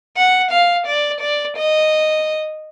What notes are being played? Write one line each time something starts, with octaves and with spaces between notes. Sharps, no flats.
F#5
F5
D5
D5
D#5